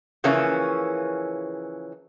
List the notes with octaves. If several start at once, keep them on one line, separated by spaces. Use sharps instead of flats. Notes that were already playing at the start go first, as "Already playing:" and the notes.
C#3 E3 F3 A#3 C#4